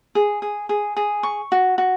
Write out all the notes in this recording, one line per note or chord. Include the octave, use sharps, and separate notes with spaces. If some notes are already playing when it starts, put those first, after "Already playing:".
G#4
G#4
G#4
G#4
C#6
F#4
F#4